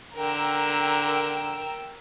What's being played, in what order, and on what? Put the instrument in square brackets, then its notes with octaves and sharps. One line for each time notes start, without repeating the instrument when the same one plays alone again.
[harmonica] D3 [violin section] A#4 G5 E6